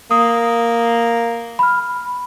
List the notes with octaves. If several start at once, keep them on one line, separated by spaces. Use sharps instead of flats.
A#3 D#6
B5 F6